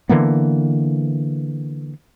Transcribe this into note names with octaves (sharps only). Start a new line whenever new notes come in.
D3 E3 A#3 B3